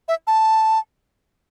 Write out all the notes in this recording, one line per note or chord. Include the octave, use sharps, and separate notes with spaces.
E5
A5